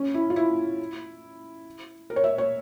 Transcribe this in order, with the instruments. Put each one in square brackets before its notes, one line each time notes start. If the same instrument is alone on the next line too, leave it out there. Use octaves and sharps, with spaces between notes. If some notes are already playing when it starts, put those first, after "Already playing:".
Already playing: [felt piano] C#4
E4
F4
E4
A#4
C#5
E5
C#5